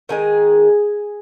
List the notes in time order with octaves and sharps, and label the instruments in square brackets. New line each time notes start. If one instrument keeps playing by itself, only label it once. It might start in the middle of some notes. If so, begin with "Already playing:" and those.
[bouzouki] D#3 G#3 G#4